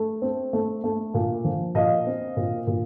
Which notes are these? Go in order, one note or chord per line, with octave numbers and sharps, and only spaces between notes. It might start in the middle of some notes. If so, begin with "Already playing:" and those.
Already playing: A3
C4
A3
A3
A#2
F3
A#2 D#5 F5
C4
A#2
A#2